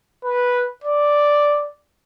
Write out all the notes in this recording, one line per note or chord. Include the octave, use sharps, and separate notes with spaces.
B4
D5